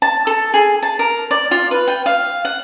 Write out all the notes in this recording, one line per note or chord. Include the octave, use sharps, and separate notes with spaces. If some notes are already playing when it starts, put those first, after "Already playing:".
A5
A4
G#4
A5
A#4
D5
F4
B4
G5
F5
F#5